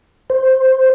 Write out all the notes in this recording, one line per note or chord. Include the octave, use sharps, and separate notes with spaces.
C5